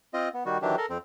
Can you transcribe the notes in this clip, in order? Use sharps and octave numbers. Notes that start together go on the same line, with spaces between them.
C4 F4 D#5
B3
D#3 G3 F#4
D#3 E3 F#3 D4 G4
A4 A#4
F2 C4